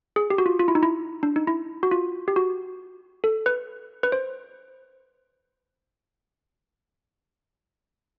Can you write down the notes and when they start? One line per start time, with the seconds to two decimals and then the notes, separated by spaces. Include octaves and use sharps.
0.16 G#4
0.30 G4
0.38 F#4
0.46 F4
0.59 F4
0.68 E4
0.75 D#4
0.83 E4
1.23 D4
1.36 D#4
1.47 E4
1.83 F#4
1.91 F4
2.28 G4
2.36 F#4
3.24 A4
3.46 B4
4.03 B4
4.12 C5